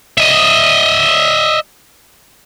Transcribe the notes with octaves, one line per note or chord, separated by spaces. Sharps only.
D#5 E5